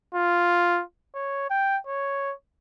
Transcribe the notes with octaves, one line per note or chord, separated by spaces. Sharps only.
F4
C#5
G5
C#5